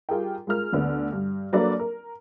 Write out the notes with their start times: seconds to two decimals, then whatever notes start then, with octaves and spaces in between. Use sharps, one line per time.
0.09 G3 F4 G4 G#4 A#4 G5
0.47 G#3 F4 A#4 F6
0.72 D2 D3 B3
1.12 G2
1.53 F#3 A#3 D4 A4 B4 D5
1.79 A#4